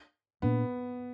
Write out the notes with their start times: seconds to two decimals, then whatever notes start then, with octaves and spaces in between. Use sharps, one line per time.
0.42 A#2 A#3 B3 D4